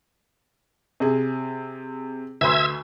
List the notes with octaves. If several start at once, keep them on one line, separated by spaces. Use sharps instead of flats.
C3 G#4
D2 B4 E5 C6 E6 G#6